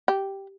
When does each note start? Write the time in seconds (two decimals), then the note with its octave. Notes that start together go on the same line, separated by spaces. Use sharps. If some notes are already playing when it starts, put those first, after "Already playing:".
0.08 G4